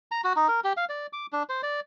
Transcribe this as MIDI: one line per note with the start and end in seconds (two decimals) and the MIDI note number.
0.12 0.21 82
0.24 0.33 66
0.36 0.48 63
0.48 0.60 70
0.64 0.73 67
0.77 0.85 77
0.89 1.07 74
1.13 1.26 86
1.33 1.43 62
1.49 1.61 72
1.63 1.80 74